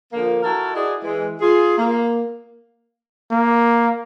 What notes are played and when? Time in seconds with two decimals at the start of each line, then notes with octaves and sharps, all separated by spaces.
0.13 D3 F3 A#3
0.43 E4 F#4 A4 A#4
0.75 E4 F#4 G#4 D5 D#5
1.04 E3 G#3
1.41 F4 G#4
1.77 A#3
3.31 A#3